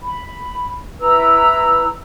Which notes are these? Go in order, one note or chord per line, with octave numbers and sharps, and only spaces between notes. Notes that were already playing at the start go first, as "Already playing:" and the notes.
B5
E4 B4 A#5 E6